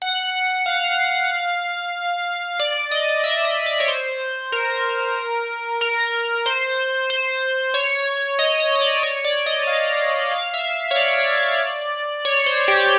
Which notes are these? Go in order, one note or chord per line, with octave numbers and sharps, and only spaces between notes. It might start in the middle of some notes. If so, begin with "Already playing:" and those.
F#5
F5
D5
D#5
E5
D#5
D5
C#5
C5
A#4
A#4
C5
C5
C#5
D#5
D#5
D#5
D5
C#5
D5
D#5
F5
F5
E5
C#5
D5
C#5
C5
G4